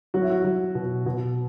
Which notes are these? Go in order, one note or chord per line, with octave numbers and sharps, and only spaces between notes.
F#3 F#4
E4
F#4
F#3
B2
B2